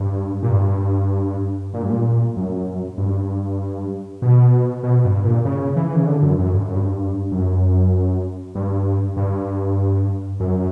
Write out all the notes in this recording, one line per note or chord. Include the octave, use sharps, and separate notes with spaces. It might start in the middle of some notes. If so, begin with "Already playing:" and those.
Already playing: G2
A#2
G2
A#2
G2
A#2
F#2
G2
B2
B2
G2
A#2
C#3
E3
C#3
D3
F#2
F#2
G2
F#2
G2
F#2
G2
G2
F#2